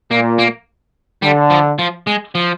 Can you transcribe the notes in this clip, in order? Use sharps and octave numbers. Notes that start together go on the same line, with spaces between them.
A#2 A#3
A#3
D3 G3
F3
F3
G#3
F3